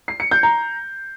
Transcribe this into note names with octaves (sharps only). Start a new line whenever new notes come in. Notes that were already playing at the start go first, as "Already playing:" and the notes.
C7
C#7
G6
A#5